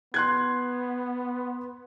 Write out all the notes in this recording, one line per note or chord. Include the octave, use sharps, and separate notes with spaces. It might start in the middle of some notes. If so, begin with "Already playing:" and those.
B3 C6 F#6 G#6